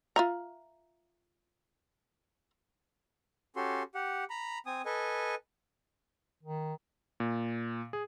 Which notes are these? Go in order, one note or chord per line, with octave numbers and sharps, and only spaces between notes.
F4 E5 A#5
C#4 F#4 G4 A4 C6
G4 F#5
A#5 B5
C4 G#5 D#6
A4 B4 D#5 G#5
D#3
A#2
G#4